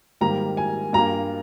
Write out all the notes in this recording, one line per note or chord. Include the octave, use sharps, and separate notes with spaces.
G#2 D#3 G3 A#3 A#5
G#5
G2 G3 A#3 A#5